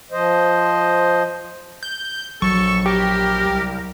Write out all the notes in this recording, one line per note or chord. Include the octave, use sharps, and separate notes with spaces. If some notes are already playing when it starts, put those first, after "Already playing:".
F3 C5 D#5
G6
A#1 F#3 A4 C#6
G4 A#4
C2